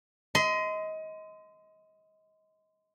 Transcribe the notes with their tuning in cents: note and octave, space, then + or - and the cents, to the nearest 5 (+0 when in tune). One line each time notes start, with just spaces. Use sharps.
D#5 +25 C6 -30